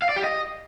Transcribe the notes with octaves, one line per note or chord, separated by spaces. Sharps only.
F5
D5
G4
D#5